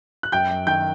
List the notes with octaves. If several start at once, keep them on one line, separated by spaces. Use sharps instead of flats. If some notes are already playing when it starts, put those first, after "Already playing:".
F#6
F#2 G5 G6
F#2
D#3 G5 G6